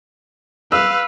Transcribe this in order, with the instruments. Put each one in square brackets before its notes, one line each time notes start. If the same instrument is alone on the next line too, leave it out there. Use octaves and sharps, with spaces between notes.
[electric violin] B4 F5 [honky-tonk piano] E6